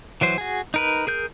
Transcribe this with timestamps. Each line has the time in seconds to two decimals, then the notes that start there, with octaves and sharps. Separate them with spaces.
0.21 E3 F#3 C5
0.38 F#4 G#4
0.74 D#4 A#4 B4
1.07 G#4 A#4 G6